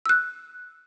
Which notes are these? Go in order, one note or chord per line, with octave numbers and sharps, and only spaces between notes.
E6 F#6